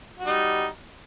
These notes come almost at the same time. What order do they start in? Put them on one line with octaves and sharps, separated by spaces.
F#4 G3 D#4